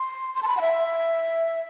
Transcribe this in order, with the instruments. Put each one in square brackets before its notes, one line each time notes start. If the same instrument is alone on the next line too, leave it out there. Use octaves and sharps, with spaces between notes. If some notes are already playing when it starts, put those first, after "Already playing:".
Already playing: [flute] C6
C6
A5
B5
F#5
E5